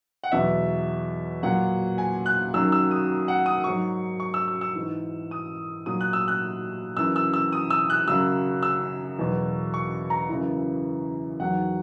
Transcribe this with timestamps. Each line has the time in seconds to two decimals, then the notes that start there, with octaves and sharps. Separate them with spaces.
0.24 F#5
0.32 E2 B2 F#3 E5
1.43 A#2 F#3 F#5
1.98 G#5
2.26 F#6
2.53 F#2 D#3 F#3 E6
2.72 E6
2.91 D#6
3.28 F#5
3.46 D#6
3.64 G#2 F#3 C#6
4.20 C#6
4.34 E6
4.48 E6
4.61 E6
4.75 G#2 E3
5.31 D#6
5.86 A#2 F#3 D#6
6.01 F#6
6.13 E6
6.28 F#6
6.97 F#2 E3 E6
7.16 E6
7.34 E6
7.52 D#6
7.70 E6
7.90 F#6
8.08 F#2 C#3 F#3 E6
8.63 E6
9.19 E2 B2 F#3
9.74 C#6
10.10 A#5
10.29 F#2 C#3 E3
11.40 E2 D#3 F#3 F#5